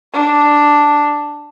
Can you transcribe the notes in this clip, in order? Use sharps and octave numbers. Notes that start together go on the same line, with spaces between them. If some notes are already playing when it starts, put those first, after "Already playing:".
D4